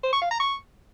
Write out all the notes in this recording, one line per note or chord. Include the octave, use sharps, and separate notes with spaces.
C5
C#6
F5
A#5
C#6